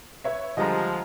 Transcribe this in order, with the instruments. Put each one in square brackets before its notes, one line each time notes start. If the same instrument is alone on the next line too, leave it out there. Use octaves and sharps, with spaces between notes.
[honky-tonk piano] B4 C#5 E5
[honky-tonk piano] D3 G3 A5 [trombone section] F3 G#3 [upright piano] D#5 A#5